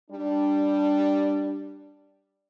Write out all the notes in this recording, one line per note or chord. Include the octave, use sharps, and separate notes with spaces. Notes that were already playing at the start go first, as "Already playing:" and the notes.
G3 D4